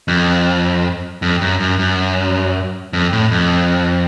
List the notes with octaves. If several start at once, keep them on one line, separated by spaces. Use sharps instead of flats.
F2
F2
F#2
F#2
F#2
F2
A2
F2